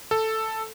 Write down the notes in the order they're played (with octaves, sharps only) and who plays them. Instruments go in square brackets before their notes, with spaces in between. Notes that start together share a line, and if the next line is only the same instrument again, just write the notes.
[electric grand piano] A4